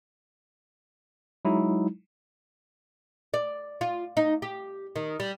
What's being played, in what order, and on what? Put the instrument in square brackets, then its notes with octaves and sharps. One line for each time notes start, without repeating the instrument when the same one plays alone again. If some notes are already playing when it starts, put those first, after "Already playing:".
[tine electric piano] F#3 G#3 D#4 E4
[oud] D5
F4
D#4
G4
D#3
G3